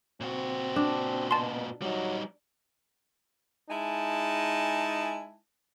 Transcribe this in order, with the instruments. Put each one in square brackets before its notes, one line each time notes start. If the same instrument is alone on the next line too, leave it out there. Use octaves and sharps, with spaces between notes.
[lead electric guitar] A#2 F#4 [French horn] C4
[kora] D4
[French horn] B2 [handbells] A5 C6
[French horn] F#3 [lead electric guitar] G3 D#4
[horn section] G#3 D#4 E4 G#5 A5